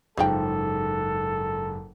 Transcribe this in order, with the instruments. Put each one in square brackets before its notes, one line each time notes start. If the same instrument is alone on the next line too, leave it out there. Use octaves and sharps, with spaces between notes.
[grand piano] F#1 G#2 [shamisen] C#3 F3 G5 [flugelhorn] A4